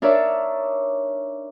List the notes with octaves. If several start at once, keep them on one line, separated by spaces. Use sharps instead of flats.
D4 D#4 A#4 C#5 D5 E5